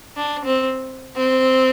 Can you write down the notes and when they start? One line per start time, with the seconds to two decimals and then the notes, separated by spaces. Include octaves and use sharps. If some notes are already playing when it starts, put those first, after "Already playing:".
0.17 D4
0.45 C4
1.16 C4